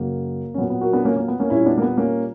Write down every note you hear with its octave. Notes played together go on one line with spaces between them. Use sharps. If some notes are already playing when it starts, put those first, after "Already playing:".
Already playing: F#2 C#3 F#3 A#3
C#4
A#2 F#3 B3
B3
F#4 A#4
B3 D4
A#3 C#4
A#3
B3
A#3 C#4
A#2 G3 C#4 E4
B3 D4
A#3
B3
A#3 C#4